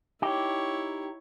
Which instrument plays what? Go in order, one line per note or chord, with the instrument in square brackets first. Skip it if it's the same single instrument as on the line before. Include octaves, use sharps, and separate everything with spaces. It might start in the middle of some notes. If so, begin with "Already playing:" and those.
[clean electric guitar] D#4 G4 [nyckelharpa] E4 C#5